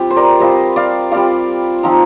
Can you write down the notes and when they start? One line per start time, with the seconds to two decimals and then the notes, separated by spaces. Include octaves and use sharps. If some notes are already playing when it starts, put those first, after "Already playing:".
Already playing: G3 C4 F4 G4
0.10 C5
0.16 A#4 D5
0.40 G3 C4 F4 C5 D#5
0.76 D5 F5
1.12 G3 C4 F4 D5 F5
1.83 F3 C4 D#4